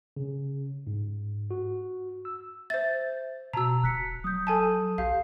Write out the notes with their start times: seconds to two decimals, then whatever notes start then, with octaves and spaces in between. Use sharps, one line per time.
0.16 C#3
0.87 G#2
1.51 F#4
2.25 E6
2.70 C5 E5 A6
3.54 B2 F#4 A5 A#5 E6
3.84 D1 F#6 B6 C#7
4.24 F#3 D#6 G6
4.47 A4 G#5 A5
4.98 B1 G4 F5 G6